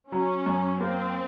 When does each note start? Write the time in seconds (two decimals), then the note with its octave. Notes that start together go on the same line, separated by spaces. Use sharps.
0.12 F#3 C#4
0.46 F#2
0.81 A#3 C4